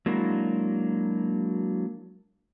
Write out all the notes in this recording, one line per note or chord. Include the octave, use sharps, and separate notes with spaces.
F#3 G#3 A#3 D4 E4 F#4